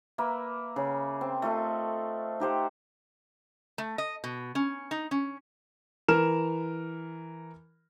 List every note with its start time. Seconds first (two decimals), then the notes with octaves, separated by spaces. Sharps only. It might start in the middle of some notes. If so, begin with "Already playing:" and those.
0.18 A#3 B4 E5
0.76 C#3 G#4
1.21 C4
1.42 A3 F4 A4 D#5
2.40 D#4 G4 C5 F#5
3.78 A3
3.98 D#5
4.24 B2
4.55 C#4
4.91 D#4
5.11 C#4
6.08 E3 A#4 F6 E7